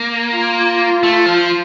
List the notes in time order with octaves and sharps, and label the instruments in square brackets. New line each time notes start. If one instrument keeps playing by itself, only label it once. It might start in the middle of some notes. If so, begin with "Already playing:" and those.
Already playing: [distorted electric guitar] A#3
[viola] F4
[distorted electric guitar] A3
F3